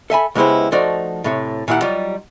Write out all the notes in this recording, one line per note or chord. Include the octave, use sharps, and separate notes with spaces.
A4 E5 G#5 B5
C#2 G#3 B3 E4 G4 C5
F3 A3 D#4 F#4 C5 D5
A2 C3 C#5
A#2 D#3 E4 G4 F#5
F#3 G3 D#4 F4 G4